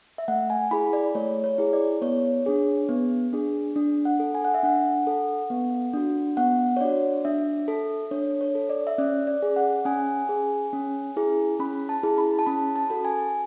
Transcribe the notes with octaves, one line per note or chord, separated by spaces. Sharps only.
E5
A3 F#5
G#5
E4 G#4 B5
D5
A3 C#5
C#5
E4 G#4
D5
B3 C#5
D4 G#4
B3
D4 G#4
D4
F#5
A4
G#5
F#5
E5
D4 F#5
A4
B3
D4 F#4
B3 F#5
C#5
D4 F#4 D5
D4 E5
A4
D4 C#5
C#5
A4
D5
E5
C#4 D5
D5
G#4
F#5
C#4 G#5
G#4
C#4
E4 G#4
C#4 B5
A5
E4 G#4
B5
A5
C#4 B5
A5
F#4 A4
G#5